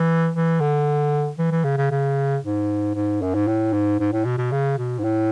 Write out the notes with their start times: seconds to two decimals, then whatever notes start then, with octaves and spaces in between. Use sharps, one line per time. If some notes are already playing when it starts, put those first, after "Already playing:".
Already playing: E3
0.35 E3
0.61 D3
1.39 E3
1.51 E3
1.64 C#3
1.77 C#3
1.91 C#3
2.43 G#2
2.95 G#2
3.22 F#2
3.35 G#2
3.47 A2
3.73 G#2
4.00 G#2
4.13 A2
4.25 B2
4.38 B2
4.52 C#3
4.78 B2
4.99 G#2
5.04 A2